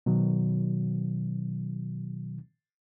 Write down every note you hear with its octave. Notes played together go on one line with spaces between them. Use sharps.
B2 D#3 F#3